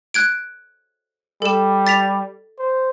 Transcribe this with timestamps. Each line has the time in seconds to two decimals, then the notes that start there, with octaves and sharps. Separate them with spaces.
0.14 F#6 G#6 D7
1.42 G3 A4 E7
1.87 A6 B6 F7
2.59 C5